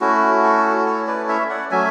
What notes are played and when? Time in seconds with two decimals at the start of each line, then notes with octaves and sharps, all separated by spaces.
0.01 A3 C#4 E4 F#4
0.43 F#4 A4
0.86 A4 C#5
1.07 B4 D5
1.28 C#5 E5
1.50 D5 F#5
1.71 F#3 A3 C#4 E5 G#5